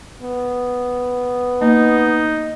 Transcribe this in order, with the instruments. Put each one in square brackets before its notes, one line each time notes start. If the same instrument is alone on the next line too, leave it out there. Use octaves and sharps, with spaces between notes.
[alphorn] B3
[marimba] A#3 [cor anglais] D#4